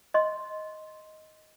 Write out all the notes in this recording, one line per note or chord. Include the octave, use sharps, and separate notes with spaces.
D#5 C6